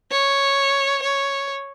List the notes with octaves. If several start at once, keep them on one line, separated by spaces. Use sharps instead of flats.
C#5
C#5